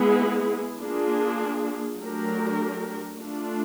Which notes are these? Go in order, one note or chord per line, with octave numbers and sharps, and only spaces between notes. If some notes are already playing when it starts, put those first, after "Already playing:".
Already playing: G#3 B3 E4 G#4
A#3 D4 F4 G#4
F#3 A3 D4 G4 A#4
A3 D4 F4